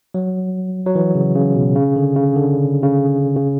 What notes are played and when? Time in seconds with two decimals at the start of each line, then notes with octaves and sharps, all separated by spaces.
0.14 F#3
0.86 F#3
0.95 E3
1.15 C#3
1.35 C#3
1.56 B2
1.76 C#3
1.96 D3
2.16 C#3
2.36 D3
2.83 C#3
3.36 C#3